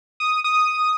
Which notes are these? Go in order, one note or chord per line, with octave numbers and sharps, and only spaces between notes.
D#6
D#6